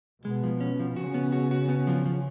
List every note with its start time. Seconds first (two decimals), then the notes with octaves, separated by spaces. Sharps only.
0.24 B2 G#3 B3
0.44 F3
0.61 C#4
0.80 F3
0.96 C#3 C#4 F#4
1.14 B3
1.32 F#4
1.51 F#4
1.69 B3
1.87 F3
2.06 F3